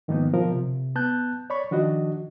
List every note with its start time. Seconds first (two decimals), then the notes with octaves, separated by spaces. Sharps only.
0.08 G#2 D#3 F3 A#3 B3 D#4
0.34 B2 D3 F3 A#4
0.52 C3
0.96 B3 A5 F#6 G6
1.50 C#5 D5 B5 C#6
1.71 D#3 F3 D4 F#4 D#5